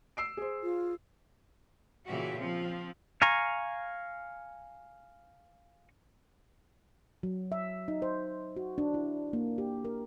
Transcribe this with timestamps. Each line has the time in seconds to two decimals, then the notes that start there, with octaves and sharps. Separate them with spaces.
0.17 E6 C7 D7
0.37 G#4 C5
0.63 F4
2.06 A#2 C#3 E3 F#4 G4 E5
2.38 F3 C4
3.22 F5 G#5 A#5 C#6
7.23 F#3
7.52 E5
7.88 D#4
8.02 C5
8.56 F#4
8.78 D4
8.94 E4
9.33 A#3
9.58 G4
9.85 A#4